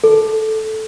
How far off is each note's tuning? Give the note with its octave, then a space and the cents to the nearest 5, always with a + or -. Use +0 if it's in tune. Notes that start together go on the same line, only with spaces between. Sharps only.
A4 -10